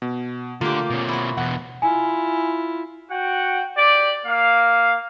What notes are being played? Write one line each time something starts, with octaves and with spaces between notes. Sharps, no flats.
B2
D3 A3 A#3 F4 G4
B2 C#4
E4 F#4
E2 B2 F#5
E4 F4 G#5
F#4 F#5 G5
G4 D5
A#3 F5